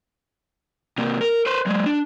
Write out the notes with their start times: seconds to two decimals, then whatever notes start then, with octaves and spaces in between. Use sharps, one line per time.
0.98 C3 A#3
1.21 A#4
1.46 B4 C5
1.66 F#3 G#3
1.86 D4